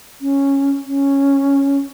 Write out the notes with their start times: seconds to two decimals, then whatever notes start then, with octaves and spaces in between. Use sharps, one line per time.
0.21 C#4
0.86 C#4